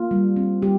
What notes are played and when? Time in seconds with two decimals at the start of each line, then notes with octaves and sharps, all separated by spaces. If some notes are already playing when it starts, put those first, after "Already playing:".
Already playing: A#3 F4
0.11 G3
0.36 C4
0.62 G3 G4